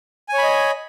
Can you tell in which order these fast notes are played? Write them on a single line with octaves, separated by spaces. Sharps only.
G#5 C#5 B5 D#5